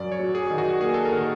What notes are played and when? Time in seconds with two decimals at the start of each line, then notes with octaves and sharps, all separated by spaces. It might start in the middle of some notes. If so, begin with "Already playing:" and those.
Already playing: F#2 D5
0.12 C#5
0.19 F#3
0.35 G#4
0.50 D#3
0.58 F#4
0.81 A#3 G#4
0.94 A4
1.05 A#4
1.12 D#3